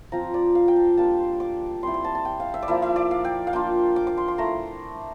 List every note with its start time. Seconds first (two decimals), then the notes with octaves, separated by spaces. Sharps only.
0.12 F3 C4 F4 A#5
0.34 D5
0.55 F5
0.68 G5
0.76 A5
0.97 G3 A#3 D4 F4 A5
1.20 C6
1.40 D6
1.83 G3 C4 E4 C6
1.94 C6
2.04 A5
2.15 A5
2.25 G5
2.40 F5
2.54 E5
2.62 D5
2.68 F3 A#3 E4 E5
2.82 E5
2.96 D5
3.11 F5
3.25 G5
3.47 F5
3.53 A#3 D4 F4 G5
3.96 D6
4.07 D6
4.17 C6
4.28 C6
4.38 A3 E4 A#5